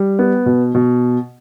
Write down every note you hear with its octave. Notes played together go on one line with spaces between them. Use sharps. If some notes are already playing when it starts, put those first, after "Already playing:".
Already playing: G3
B3
B2
B2